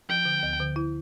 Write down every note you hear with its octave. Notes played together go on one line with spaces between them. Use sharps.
F3 G5
D3
D2
D3
E4